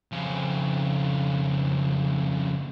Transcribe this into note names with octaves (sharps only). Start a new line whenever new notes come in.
F2 C#3